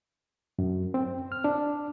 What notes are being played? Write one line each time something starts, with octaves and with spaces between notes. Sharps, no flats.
F#2
C4
F6
D4